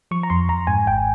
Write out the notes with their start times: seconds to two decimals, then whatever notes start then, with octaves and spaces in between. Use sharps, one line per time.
0.11 F3 C#6
0.23 A#5
0.30 F2 C6
0.49 F2 A#5
0.67 G#2 G#5
0.86 G#1 G5